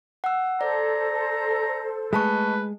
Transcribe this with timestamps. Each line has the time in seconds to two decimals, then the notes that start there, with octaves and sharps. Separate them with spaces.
0.24 F#5 E6
0.61 A4 C5 D5 A#5
2.13 G#3 A3 B4 A5 C#6